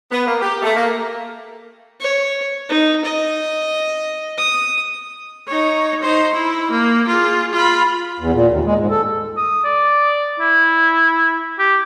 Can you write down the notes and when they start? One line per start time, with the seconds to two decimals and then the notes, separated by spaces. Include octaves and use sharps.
0.11 B3
0.26 A#3
0.41 G4
0.62 A3
0.76 A#3
2.00 C#5
2.69 D#4
3.05 D#5
4.38 D#6
5.47 D#4 C#5
6.01 D#4 C5
6.34 E4
6.71 A#3
7.08 F4 G#4
7.53 F4 B5
8.20 E2
8.33 A#2
8.48 D#2
8.65 G#3
8.79 G#2
8.90 A4
9.37 D#6
9.64 D5
10.40 E4
11.59 G4